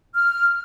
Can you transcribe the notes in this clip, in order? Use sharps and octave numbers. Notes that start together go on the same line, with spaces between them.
F6